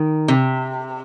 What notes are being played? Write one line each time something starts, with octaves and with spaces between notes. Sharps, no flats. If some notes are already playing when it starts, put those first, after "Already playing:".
Already playing: D#3
C3